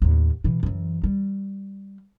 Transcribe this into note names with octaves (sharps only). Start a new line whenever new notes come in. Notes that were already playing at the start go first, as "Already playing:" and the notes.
D#2 A2
B2 E3
F#2 E3
G3